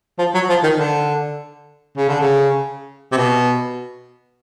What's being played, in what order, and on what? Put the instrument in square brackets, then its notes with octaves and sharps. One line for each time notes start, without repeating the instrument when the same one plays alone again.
[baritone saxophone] F3
F#3
F3
D#3
D3
C#3
D3
C#3
C3
B2